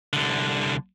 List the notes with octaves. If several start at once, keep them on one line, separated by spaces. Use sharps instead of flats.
C2 D3